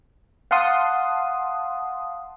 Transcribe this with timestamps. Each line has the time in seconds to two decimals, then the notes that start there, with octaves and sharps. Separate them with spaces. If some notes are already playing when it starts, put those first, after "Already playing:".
0.51 F5 F#5 A5 C6 D#6